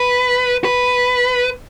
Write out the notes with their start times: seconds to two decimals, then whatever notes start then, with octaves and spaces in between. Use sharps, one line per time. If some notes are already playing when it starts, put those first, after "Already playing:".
Already playing: B4
0.65 B4